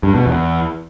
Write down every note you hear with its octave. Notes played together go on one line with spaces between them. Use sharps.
G2
B2
E2